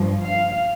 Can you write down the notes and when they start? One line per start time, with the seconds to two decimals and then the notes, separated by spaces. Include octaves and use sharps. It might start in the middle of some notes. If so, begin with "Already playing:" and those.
Already playing: G2 F3
0.23 F5